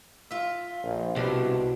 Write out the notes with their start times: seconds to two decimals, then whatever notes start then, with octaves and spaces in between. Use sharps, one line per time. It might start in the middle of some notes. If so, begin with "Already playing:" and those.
0.31 F4 E5
0.83 A#1
1.16 C2 B2 D4